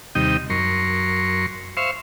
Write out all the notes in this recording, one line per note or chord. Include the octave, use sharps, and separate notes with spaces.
D#2 C3 G3 D#4 D#5 G5
F#2 A#4 C6 C#6
C5 E5 F5 C6 C#6